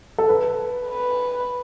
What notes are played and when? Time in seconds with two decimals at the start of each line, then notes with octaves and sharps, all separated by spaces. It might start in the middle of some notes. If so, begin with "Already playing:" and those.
0.18 A4
0.29 B4
0.89 B4